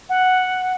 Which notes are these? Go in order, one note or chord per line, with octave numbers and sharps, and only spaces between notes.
F#5